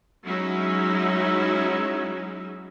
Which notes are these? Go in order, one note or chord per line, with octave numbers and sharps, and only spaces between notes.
F#3 G#3 C#4 D#4 E4 E5